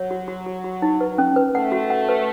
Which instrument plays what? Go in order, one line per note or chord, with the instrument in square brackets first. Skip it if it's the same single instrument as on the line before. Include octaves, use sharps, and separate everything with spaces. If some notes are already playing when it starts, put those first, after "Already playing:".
Already playing: [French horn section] F#3 [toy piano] C#5
[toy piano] F#4
F#4
F#4
F#4
D#4
B4
C#4
B4
[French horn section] A3 [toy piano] F#5
[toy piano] F#4
F#5
B4